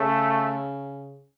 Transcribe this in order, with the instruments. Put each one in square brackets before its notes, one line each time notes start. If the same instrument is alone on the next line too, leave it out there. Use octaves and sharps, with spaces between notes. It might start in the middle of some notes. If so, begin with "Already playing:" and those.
Already playing: [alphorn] C#3 [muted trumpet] A3